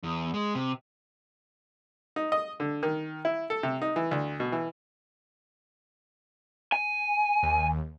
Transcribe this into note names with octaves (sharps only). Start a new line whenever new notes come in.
E2
G#3
C3
D#4
D#5
D3
D#3
E4
A4
C3
D#4
E3
D2
B2
E3
G#5
D#2